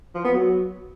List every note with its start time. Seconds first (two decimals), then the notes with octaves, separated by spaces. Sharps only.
0.15 F3
0.24 B3
0.34 F#3